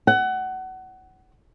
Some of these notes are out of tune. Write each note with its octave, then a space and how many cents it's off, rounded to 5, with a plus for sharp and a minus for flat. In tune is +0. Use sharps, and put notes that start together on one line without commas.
F#5 +25